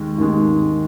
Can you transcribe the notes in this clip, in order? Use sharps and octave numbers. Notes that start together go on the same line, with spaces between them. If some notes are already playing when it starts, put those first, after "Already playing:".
Already playing: D#2 D#3 G#3
D#2 D#3 G#3